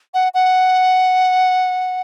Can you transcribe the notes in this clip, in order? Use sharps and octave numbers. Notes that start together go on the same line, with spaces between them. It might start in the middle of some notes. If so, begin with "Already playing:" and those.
F#5
F#5